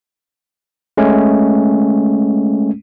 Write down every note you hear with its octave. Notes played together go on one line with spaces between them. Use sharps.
G#3 A3 C#4